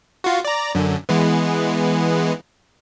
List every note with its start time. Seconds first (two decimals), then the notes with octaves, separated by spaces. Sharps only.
0.24 F4 F#4
0.45 D5 A#5
0.75 F#2 D3
1.09 E3 G#3 B3